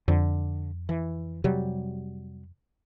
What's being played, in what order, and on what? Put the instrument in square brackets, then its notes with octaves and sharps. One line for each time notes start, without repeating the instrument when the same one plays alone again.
[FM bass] F2 [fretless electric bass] D3
[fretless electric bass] E3
C3 F#3 G3